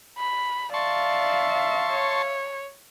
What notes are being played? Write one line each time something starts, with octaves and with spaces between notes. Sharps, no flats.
B5
D5 E5 F5 A5 C6 C#6
C#5